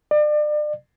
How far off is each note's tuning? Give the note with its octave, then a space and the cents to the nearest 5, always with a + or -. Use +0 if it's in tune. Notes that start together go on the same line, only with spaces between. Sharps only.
D5 +35